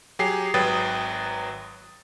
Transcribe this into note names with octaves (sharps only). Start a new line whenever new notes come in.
F#3 G4 G#4 C7
G#1 F#3 B4 G5 D#6 A6